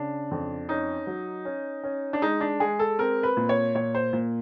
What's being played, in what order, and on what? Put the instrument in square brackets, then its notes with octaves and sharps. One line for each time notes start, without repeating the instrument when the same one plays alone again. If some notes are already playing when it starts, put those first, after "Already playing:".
Already playing: [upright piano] C#3 D4
F2
C#4 D#4
F#3
C#4
C#4
D4
G#3 D#4
D4
G#3 G#4
A4
C4 A#4
B4
A#2
C#5
A#2 C#5
C5
A#2